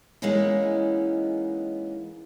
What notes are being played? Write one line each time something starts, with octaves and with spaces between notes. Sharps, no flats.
E3 G#3 A#3 B3 C#4 D#4